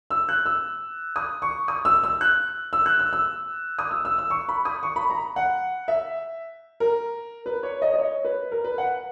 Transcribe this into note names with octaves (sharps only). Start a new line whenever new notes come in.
E6
F#6
E6
D#6
C#6
D#6
E6
E6
F#6
E6
F#6
E6
E6
D#6
E6
E6
E6
C#6
B5
D#6
C#6
B5
A#5
F#5
E5
A#4
B4
C#5
D#5
D#5
C#5
B4
A#4
B4
F#5